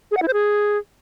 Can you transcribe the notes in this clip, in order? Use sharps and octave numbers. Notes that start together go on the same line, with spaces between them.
G#4
F#5
E4
C5
G#4